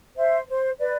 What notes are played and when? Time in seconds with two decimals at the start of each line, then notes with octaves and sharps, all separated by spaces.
0.16 C5 E5
0.49 C5
0.79 B4 D5